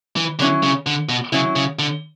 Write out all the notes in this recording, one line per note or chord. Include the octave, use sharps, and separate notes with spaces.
E3
D3 F#3 C#4 E4
C#3
D3
B2
C#3 F#3 C#4 E4
C#3
D3